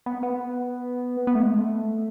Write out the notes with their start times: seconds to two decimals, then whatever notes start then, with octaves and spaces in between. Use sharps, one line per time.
0.06 B3
0.23 B3
1.27 B3
1.35 A3
1.43 G#3
1.50 A3